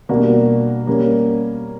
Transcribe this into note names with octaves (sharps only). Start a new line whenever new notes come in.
B2 G3 A#3 D4 F#4
G3 A#3 C#4